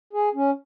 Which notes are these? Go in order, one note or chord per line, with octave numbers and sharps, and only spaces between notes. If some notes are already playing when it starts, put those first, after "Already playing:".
G#4
C#4